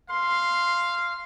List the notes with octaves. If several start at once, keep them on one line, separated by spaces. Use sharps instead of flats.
F5 C6